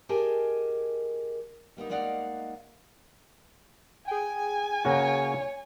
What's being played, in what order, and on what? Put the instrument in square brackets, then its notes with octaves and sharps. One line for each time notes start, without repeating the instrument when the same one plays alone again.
[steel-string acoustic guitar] G4 G#4 A#4 D#5 G#5 A5
G3 A#3 B3 D#4
G#3 A#3 D#4 D5 F5 F#5
[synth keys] G#4 G5 [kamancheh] G#5
[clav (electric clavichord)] C#3 A#3 F#4 [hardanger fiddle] C#5